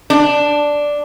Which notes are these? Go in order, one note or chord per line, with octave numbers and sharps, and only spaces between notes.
D4